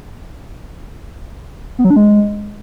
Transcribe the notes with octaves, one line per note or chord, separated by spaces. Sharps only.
B3
F#3
D4
G#3